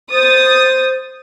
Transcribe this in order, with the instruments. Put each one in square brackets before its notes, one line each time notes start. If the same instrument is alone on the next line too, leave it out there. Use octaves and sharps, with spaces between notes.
[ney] C5 [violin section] D#6 A6